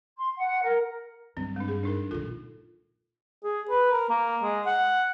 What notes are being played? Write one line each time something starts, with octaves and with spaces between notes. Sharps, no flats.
C6
F#5
A#4
G2 C4
G#3 D4
G#4
D4 D#4 A#4
D#2 A#2 F4 A4
G#4
B4
A#4
A#3
G#3
F#5